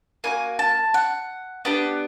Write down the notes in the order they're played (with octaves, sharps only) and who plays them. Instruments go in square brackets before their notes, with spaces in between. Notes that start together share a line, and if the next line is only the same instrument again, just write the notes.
[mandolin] A#3 D#4 F#4 G#5
A5
F#5
B3 D4 G4 F#5